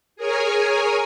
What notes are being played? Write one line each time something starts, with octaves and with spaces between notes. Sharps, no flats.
G#4 A#4 C#5 G#5